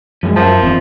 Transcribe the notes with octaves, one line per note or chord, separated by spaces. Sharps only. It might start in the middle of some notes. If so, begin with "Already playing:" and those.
F#2 F3 G#3 A3
F#2 F3 A#4 E5 A5
D#1 E3 B3 C4